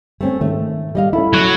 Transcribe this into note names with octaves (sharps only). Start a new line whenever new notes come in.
A3 C4 C#4
G#2 D#3 A3
G3 D#5 F5
C#4 E4 A4 B5
F#3 F#4